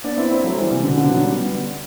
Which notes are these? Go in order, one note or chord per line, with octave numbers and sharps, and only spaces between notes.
B3 D4
C4 E4
C4 E4
F#3 A3
E3 G3
C3 E3
B2 D3
B2 D3
D3 F#3
G3 B3